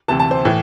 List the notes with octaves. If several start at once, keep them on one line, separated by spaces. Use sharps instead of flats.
D2 C3 E3 A5
A5
C5
A2 E3